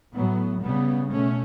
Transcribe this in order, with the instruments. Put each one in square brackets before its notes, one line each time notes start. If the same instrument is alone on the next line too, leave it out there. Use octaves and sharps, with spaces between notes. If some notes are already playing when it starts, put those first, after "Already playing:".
[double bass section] A2 F#3 B3
C#3 G3 B3
B2 A3 C#4